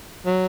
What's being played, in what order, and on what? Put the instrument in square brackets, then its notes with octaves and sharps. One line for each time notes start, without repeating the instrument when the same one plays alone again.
[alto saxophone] F#3